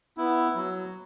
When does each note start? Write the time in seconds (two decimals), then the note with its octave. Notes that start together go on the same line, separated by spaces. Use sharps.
0.17 B3 E4
0.55 F#3